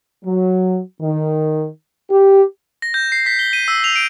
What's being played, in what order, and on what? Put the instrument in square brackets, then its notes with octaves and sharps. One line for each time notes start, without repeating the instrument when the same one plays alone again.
[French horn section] F#3
D#3
G4
[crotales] A#6
G6
C7
B6
G7
D#7
E6
F7
D7